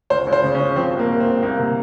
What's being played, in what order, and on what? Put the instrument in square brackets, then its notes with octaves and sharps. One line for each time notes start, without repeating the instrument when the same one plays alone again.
[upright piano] C#2 C5
C#2
C5
C#3
C#4
C#3
F3 C4
C2
A#3
C2
C4
C2
C2 A#3
C3